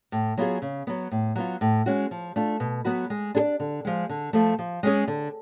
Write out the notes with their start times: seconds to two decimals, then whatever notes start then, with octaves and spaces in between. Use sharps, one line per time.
0.12 A2
0.38 F#3 B3 F4 G#4
0.62 C#3
0.87 F#3 B3
1.12 A2
1.36 F#3 B3 F4
1.61 A2
1.86 G#3 C#4 F#4
2.11 F3
2.36 A3 D4 F4
2.60 B2
2.85 F#3 B3 F#4 B4
3.10 G#3
3.35 D4 G#4
3.39 D5
3.60 D3
3.85 F3 G#3
4.09 D3
4.33 F3 A3
4.59 F3
4.83 G#3 C#4 G#4
5.08 D3